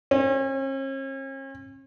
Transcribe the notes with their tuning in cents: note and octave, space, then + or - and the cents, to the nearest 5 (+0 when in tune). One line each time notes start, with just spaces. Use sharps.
C#4 -45